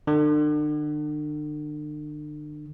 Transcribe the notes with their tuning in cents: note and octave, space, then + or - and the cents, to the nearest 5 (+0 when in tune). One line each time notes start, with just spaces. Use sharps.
D3 +40